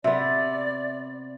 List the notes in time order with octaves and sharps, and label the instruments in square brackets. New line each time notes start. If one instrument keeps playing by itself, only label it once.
[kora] C3 B3 [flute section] D5 [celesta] E5